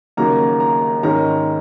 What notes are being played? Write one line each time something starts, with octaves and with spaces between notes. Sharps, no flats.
D#2 C#3 F#3 A#3 A#5
A#5
G#2 D#3 G#3 C#4 A#5